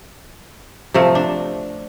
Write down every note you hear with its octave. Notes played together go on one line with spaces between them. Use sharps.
C3 F3 A3
D4